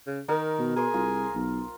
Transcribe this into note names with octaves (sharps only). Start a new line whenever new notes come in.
C#3
D#3 A#4
B2
G#4 A#4 C5 D#6
C2 F4
B1